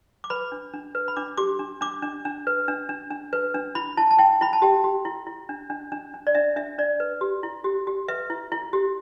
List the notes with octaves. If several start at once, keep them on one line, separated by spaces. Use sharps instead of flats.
D6
B4 B5
D4
D4
B4
B5
D4 D6
G4 D6
D4
D4 D6
D4
D4
B4
D4
D4
D4
B4
D4
E4 B5
E4 A5
A5
E4 G5
E4 B5
A5
G4 G5
G4
E4
E4
D4
D4
D4
D4
D5
D4 E5
D4 E5
D4 D5
B4
G4
E4
G4
G4
B4 E5
E4
E4
G4